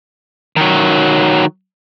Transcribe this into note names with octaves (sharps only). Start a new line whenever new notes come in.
D#3 F#3